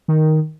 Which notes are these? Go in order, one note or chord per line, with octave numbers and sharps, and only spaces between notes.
D#3